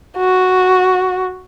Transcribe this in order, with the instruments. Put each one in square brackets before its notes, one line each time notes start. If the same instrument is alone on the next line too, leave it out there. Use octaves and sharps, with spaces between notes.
[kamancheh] F#4